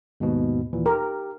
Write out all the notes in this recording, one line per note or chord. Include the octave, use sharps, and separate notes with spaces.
D#2 G#2 B2
D#2 A#2 E3
G4 A#4